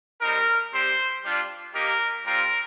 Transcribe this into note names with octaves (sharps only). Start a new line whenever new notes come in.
G3 C4 D#4 A#4
G3 C4 G4 C5
G3 D4 F4
A#3 D#4 G4 A#4
G3 C4 F4 A#4